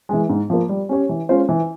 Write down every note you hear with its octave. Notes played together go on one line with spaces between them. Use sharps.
E3 G#3
G#2
F3 A#3
G3
C#4 G4 C#5
E3
G#3 C#4 F4 C5
E3